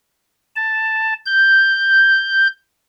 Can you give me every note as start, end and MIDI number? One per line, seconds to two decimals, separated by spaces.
0.56 1.14 81
1.26 2.47 91